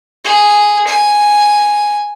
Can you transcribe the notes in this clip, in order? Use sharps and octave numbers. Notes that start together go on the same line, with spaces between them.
G#4
G#5